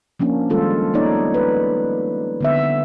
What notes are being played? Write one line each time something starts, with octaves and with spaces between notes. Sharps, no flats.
F3 A#3 C#4 D4
D#3 G3 G#3 F4 A4
A#3 B3 D#4 C#5 D5
B4
D3 B3 E5